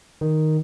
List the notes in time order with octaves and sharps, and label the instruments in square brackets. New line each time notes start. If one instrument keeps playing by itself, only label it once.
[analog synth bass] D#3